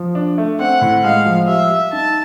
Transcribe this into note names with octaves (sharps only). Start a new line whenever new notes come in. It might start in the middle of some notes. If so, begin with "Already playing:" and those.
Already playing: F3
D4
A3
C4 F#5
A2
G#3 F5
F3
G3 E5
G3
D#4 A5